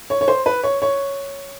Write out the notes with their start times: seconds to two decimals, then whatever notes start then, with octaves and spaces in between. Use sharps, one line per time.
0.10 C#5
0.21 C#5
0.28 C5
0.46 B4
0.63 C#5
0.82 C#5